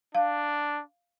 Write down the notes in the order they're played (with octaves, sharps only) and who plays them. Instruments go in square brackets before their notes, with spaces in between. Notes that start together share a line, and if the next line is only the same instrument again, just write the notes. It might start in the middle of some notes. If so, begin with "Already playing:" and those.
[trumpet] D4 [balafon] F5